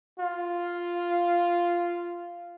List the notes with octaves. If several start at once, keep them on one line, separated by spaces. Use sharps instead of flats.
F4